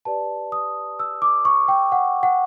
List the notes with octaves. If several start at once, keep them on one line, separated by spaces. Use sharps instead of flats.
G4 B4 D5 A5
D#6
E6
D6
C#6
G5
F#5
F#5